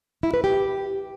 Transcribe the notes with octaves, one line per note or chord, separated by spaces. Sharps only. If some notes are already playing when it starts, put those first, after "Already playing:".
E4
B4
G4